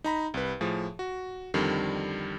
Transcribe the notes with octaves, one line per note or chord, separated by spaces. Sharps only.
D#4 A#5 B5
C2 B4
A2 F3 G#4
F#4
F2 D3 D#3 G3